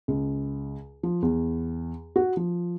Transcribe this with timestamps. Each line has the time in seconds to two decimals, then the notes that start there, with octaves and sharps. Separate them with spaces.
0.08 C#2
1.03 F3
1.22 E2
2.16 F#4
2.37 F3